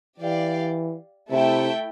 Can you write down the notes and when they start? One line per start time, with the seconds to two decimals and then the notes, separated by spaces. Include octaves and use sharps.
0.20 E3 G4 D5 F5
1.31 C3 A3 E4 A4 E5 G5